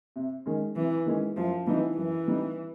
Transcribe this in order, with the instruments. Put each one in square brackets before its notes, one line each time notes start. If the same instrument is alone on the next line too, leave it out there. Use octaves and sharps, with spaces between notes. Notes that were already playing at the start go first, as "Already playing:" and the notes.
[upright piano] C3
D#3 G#3 C#4
[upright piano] C3 [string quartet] E3
[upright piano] D#3 G#3 C#4
[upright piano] F#2 [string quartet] F3
[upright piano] D3 G3 C4 D#4 [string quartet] E3
[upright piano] F#2 [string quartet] E3
[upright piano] D3 G3 C4 D#4